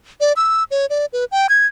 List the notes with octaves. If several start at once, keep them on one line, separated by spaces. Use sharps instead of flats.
D5
E6
C#5
D5
B4
G5
G#6